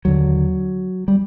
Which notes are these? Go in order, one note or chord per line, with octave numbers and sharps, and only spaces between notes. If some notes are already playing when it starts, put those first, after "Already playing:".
D#2 D3 F#3
G3